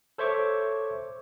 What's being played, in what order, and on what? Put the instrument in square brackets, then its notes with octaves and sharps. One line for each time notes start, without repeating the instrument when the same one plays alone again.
[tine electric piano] A4 C5 C#5 E5 C#6 D6